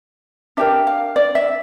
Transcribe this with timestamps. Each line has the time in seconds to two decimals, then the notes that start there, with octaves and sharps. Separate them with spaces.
0.57 D4 G4 A#4 E5
0.87 F5
1.16 D5
1.35 E5